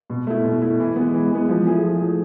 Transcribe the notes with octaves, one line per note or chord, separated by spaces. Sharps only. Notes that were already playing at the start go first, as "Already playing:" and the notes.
B2
A3 E4
B2
A3 E4
E3
G#3 B3
E3
G#3 B3
F3
A3 E4 G#4
F3
A3 E4 G#4